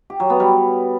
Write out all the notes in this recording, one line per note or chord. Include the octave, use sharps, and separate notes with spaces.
G4
F#3
B3
G3